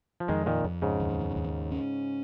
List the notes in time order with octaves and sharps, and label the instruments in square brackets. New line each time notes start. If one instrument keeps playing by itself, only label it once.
[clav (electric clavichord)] F3
[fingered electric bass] F2 [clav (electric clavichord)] D#3 G#3
[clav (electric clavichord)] A#2 D#3
[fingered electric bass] F2
[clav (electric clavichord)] G#2 C#3
[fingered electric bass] D#2
D#2
C#4